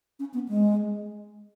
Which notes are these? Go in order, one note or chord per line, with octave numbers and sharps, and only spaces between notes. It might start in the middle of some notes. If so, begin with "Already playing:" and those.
C#4
B3
G#3